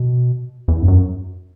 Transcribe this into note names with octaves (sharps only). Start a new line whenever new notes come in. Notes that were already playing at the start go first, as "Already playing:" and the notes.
Already playing: B2
E2
G2
F#2